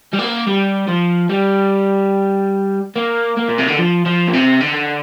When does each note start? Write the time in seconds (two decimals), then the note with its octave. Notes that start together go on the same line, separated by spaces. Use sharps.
0.14 G3
0.19 A#3
0.47 G3
0.88 F3
1.30 G3
2.96 A#3
3.37 A#3
3.49 A#2
3.59 C3
3.68 D3
3.79 F3
4.06 F3
4.28 A#2
4.33 C3
4.61 D3